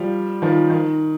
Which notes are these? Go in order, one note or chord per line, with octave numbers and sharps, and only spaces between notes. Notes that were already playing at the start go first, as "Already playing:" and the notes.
Already playing: F3 G3
D#3 F3
D#3